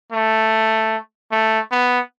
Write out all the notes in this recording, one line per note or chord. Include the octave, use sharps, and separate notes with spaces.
A3
A3
B3